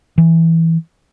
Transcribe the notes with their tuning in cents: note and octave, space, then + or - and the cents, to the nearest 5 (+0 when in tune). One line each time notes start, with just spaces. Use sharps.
E3 -5